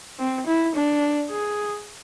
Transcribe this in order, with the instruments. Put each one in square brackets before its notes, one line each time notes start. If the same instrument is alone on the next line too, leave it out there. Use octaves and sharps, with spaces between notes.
[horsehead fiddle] C4
E4
D4
G#4